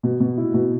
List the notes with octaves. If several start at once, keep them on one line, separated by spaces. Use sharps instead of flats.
B2
B2
E4
B2